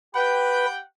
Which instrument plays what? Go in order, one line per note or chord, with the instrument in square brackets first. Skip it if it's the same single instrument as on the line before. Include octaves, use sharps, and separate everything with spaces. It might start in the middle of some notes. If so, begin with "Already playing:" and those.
[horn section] G4 F#5 G5 [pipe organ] B4